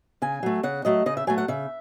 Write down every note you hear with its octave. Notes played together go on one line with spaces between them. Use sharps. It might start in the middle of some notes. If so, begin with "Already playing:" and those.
C#3 G#5
F#3 A3
C#3 F#5
F#3 A3 D#5
C#3 D#5
E5
F#3 A3 G#5
F#5
C#3 E5